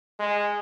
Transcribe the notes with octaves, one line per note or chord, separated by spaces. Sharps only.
G#3